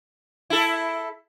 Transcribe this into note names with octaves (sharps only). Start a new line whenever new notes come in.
E4 A4